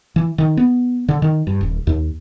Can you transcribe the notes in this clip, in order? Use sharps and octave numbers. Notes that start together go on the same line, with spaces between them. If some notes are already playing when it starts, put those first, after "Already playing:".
E3
D#3
B3
D3
D#3
G2
D#1
D#2